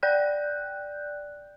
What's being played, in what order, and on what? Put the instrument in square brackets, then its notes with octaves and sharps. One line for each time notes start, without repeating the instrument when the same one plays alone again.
[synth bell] D5 G5 F#6 G6